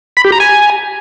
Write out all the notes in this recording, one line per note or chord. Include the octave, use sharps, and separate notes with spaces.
B5
G4
A#5
G#5